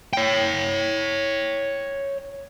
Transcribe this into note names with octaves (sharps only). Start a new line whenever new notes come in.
C#5 G5